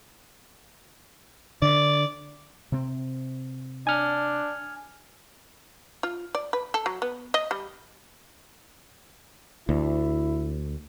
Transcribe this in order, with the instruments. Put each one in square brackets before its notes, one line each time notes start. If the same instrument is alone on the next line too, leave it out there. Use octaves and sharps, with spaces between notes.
[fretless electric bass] D3 [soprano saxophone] D5
[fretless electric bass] C3 C4
[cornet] D4 [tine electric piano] G#5 F6
[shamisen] F4
D5
B4
A4
F#3
B3
D#5
G3
[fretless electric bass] D2 [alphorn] E4